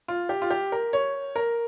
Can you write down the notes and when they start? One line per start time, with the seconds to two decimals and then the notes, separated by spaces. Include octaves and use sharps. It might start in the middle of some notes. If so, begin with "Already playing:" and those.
0.08 F4
0.29 G4
0.42 F4
0.50 G4
0.72 A#4
0.93 C#5
1.36 A#4